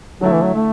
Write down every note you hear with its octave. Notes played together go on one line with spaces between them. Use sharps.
D3 F#3 A3 E4
E3
F#3
A3